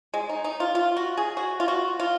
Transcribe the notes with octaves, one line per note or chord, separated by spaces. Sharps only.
G#3
D#4
D#4
F4
F4
F#4
G#4
F#4
F4
F#4
F4